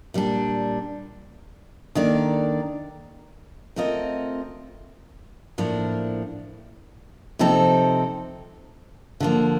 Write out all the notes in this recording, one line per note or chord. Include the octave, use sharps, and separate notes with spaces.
A#2 G3 D4
D#3 A#3 D4 A4 D5
A3 C4 F4 A#4 D#5
A2 F3 A#3 D4
C3 F3 C4 D#4 A4
D3 F3 A#3